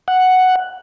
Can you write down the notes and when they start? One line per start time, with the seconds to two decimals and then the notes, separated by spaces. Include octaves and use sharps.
0.08 F#5